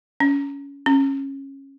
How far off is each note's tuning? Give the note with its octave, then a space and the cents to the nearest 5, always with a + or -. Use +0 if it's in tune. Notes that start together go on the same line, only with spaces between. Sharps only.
C#4 +20
C#4 -20